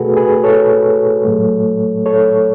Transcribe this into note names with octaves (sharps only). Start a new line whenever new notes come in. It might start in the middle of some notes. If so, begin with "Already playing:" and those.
Already playing: B2 A3 F#4 G#4 A4 B4
G#4 B4
A4 C#5
A2 F#3 A3
A4 C#5